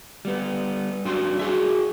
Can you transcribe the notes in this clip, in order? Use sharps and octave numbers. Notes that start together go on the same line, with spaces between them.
G3 B3
G2 F#3 D4 C6
F#4 G#4 E5